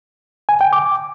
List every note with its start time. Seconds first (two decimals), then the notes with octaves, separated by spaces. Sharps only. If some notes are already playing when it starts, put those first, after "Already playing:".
0.49 G#5
0.61 G5
0.73 D6